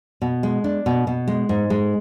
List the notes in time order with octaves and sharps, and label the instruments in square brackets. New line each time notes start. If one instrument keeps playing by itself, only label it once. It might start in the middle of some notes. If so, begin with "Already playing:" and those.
[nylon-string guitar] B2
G#3
D4
B2
B2
G#3
G#2
G#3